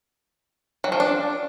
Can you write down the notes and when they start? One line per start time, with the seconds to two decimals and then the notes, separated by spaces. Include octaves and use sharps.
0.84 F#3
0.92 F3
1.00 D4